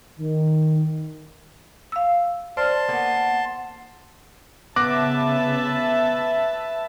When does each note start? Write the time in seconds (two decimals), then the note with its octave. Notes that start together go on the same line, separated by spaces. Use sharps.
0.20 D#3
1.92 F5 E6
2.57 C5 D5 A5 C6 F6
2.89 A#3 B3 F#5
4.76 C#3 B3 B4 E5 A5 D6 F#6 A#6